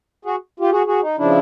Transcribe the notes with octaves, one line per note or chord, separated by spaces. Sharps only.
F#4 G#4
F4 G4
F#4 G#4
F#4 G#4
D#4
C#3 F3 D4 E4